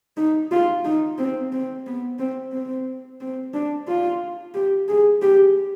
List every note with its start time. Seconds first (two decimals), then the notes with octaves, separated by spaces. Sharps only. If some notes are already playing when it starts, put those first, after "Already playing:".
0.17 D#4
0.52 F4
0.85 D#4
1.18 C4
1.53 C4
1.86 B3
2.19 C4
2.52 C4
3.21 C4
3.54 D4
3.88 F4
4.54 G4
4.88 G#4
5.22 G4